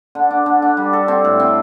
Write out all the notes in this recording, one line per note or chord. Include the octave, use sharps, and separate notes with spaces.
D3
D4
D3
D4
G3
A4
C4
A2
C4